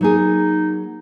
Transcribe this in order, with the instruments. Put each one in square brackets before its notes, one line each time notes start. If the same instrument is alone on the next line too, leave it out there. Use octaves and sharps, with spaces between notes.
[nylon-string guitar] F#3 A#3 G#4 [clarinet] D#4